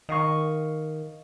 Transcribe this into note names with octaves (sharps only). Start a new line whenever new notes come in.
D#3 D#5 F5 C#6